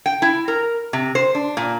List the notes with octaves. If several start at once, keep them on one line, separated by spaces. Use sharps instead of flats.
G5
E4
A#4
C3
C5
D4
A#2